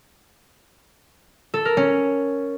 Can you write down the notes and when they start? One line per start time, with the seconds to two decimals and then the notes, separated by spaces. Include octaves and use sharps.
1.54 A4
1.65 A#4
1.77 C#4